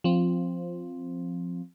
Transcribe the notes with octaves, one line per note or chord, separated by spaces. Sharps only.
F3 C4